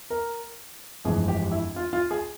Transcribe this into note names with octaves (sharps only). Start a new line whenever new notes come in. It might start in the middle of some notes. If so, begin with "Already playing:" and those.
A#4
G1 F2 E3 G#3 G#4
G4
E4
F4
F4
G#4